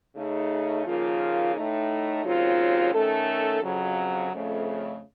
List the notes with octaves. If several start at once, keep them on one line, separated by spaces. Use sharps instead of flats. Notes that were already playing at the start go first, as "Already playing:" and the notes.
C#3 A3 D#4
D#2 C#3 F3 A#3 F4
A2 A3 D#4
D#2 C#3 F#3 C4 F4
D#3 A3 C#4 A4
F2 C#3 F#3
F2 C#3 A3